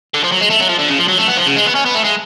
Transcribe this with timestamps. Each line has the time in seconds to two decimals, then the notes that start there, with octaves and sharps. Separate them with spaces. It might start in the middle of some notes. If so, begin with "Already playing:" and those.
0.14 D3
0.24 F3
0.32 F#3
0.41 G#3
0.50 A3
0.60 F#3
0.69 F3
0.79 D3
0.89 C#3
0.99 F3
1.08 F#3
1.18 A3
1.28 B3
1.37 F3
1.46 C#3
1.56 G#3
1.66 B3
1.75 C#4
1.86 B3
1.95 A3
2.04 G#3